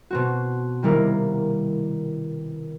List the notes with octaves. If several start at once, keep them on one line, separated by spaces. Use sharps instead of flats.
B2 C4 F#4
C3 D#3 G3 A#3 E4 A#4